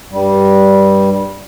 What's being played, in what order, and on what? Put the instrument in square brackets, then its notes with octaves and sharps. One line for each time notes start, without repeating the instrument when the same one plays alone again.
[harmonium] G2 G3